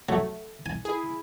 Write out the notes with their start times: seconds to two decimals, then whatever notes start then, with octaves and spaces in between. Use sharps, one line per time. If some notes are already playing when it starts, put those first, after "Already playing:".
0.09 F#3 A3
0.66 G#5
0.85 E4 G#4